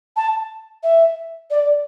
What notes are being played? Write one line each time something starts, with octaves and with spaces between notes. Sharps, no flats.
A5
E5
D5